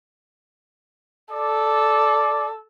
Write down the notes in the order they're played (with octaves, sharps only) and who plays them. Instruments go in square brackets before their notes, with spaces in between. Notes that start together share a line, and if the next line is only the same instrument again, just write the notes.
[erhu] A4 [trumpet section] D5